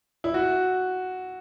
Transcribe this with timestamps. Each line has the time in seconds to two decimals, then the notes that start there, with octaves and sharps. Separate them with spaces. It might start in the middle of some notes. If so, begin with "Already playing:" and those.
0.24 E4
0.34 F#4